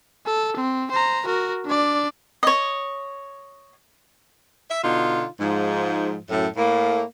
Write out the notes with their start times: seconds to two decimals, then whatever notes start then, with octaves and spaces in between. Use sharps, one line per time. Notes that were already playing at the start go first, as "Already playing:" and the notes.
0.26 A4
0.57 C4
0.91 C5 A#5
1.26 F#4 A#4
1.65 D4 D5
2.43 C#5 D#5
4.69 E5
4.83 B2 D3 D#4 F4
5.40 G#2 F3
6.29 F#2 A2
6.57 A2 A#3